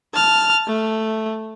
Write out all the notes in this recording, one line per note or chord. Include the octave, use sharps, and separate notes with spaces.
A5 F6
A3